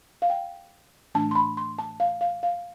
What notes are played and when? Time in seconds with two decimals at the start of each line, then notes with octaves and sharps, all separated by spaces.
0.22 F5
0.30 G5
1.14 A2 E3 A3 D4 A5
1.31 C6
1.35 B5
1.57 C6
1.79 A5
2.00 F5
2.21 F5
2.43 F5